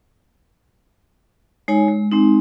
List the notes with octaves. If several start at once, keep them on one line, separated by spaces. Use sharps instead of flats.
G#3 D#4 C#5 G#5
G#3
G#3 C4 D#4